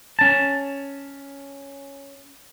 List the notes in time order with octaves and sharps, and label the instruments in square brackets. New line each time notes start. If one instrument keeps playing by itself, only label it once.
[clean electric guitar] C#4 A5